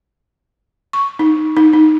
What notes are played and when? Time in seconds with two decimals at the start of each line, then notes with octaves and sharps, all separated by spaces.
0.93 C#6
1.19 D#4
1.57 D#4
1.73 D#4